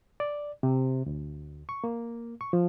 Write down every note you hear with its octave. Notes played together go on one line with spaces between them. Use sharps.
D5
C3
D2
C#6
A#3
C#6
F3